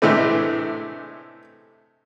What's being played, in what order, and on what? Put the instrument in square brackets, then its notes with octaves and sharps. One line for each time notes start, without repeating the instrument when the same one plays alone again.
[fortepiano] A2 C3 E3 G#3 A3 D4